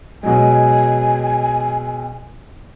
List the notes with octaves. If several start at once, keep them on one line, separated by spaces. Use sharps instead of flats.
B2 F#3 G#3 G#5